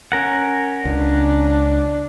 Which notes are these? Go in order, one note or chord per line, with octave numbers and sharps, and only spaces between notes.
C#4 A#4 F#5
C#2 D4